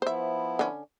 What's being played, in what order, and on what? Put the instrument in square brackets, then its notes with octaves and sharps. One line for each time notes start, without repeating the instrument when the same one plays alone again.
[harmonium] F3 B3 E4 [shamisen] C5 E5
[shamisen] D3 C#4